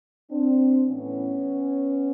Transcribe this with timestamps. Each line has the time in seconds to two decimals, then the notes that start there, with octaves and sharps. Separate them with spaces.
0.30 C4 D4
0.87 A2 E3 B3 C#4